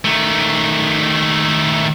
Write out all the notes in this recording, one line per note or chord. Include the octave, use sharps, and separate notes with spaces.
D#3 A3